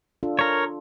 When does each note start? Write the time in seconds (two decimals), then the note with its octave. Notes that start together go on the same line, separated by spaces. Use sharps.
0.23 D4 F4 A4
0.39 A#4 C#5